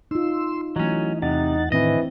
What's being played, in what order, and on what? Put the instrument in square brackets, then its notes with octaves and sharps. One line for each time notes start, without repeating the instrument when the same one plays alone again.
[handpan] D#4 F4 [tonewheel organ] C6 E6
[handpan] E3 A3 [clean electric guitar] F#3 C#4 [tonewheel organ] D#5
[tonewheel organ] E2 F#5 A6 [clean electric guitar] C3 [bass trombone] D#4
[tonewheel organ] A2 D#3 [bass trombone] E3 [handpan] C4 D4 [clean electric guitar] D#5